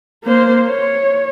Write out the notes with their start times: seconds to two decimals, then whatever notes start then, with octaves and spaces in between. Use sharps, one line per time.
0.24 A#3 C5
0.68 C#5